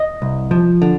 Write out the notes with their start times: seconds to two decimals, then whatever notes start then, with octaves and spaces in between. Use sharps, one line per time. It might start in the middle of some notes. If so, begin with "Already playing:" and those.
Already playing: D#5
0.22 C2
0.51 F3
0.82 D3